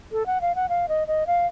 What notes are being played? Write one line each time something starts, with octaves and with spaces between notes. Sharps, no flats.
A4
F#5
F5
F#5
F5
D#5
D#5
F5